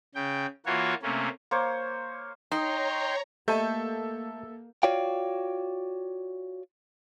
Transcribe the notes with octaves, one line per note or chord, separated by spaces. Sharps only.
C#3 G5
E3 A#3 F4 F#4 C#5
C3 A3 A#3 C#4
A#3 C5 C#5
D#4 C#5 G5 A#5 C6
A3 A#3 G4 A4 D#5 E5 A5 G6
F4 F#4 C#5 D5 F5 G5